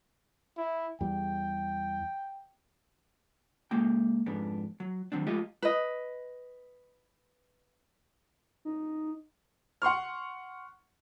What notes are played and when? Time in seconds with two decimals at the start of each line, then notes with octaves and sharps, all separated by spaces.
0.57 E4
1.01 E2 G3 G5
3.71 C#3 G#3 A#3 G5
4.26 F2 G#2 B3 D4
4.80 F#3
5.12 D#3 F#3 C4 D4
5.27 F3 G#3 A3 F4 G4 D#5
5.62 B4 D#5
8.65 D#4
9.82 F#5 C6 C#6 F6